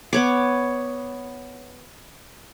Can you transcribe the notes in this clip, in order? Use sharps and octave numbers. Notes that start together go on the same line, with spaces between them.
B3 C#5 D6